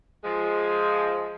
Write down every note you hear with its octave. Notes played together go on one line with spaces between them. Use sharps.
F3 G#3